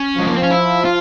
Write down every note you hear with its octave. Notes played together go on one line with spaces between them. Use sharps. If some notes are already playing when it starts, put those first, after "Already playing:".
Already playing: C#4
F3 G#3
A#3
C4
C#4
E4
F4